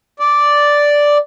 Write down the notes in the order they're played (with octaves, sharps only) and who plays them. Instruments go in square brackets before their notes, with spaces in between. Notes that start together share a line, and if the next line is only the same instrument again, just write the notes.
[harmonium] D5